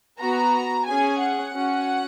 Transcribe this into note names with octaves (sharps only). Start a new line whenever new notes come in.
B3 F#4 A#5
C#4 G#4 G#5
F#5
C#4 F#4